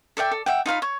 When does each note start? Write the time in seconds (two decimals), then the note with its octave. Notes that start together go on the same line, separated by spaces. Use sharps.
0.17 A4 D5 E5 G5
0.31 A4
0.46 E5 F#5 G5
0.66 D#4 F4 F5 B5
0.82 C#5